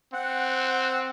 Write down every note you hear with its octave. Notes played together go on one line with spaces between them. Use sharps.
C4 F#5